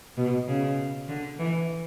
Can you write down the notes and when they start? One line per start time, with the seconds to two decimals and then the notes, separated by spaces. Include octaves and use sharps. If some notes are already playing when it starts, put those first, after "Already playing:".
0.17 B2
0.47 C#3
1.08 D3
1.39 E3